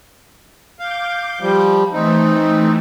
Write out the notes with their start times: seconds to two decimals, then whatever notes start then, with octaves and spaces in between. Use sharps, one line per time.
0.79 F5 D6 G6
1.41 F3 G3
1.92 E3 A3 C4 D#4